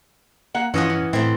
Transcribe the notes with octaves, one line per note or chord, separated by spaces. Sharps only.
A#3 F#5
G2 E3 F3 C#4 D#5 F#5
C#4
A2 A3 C4 E4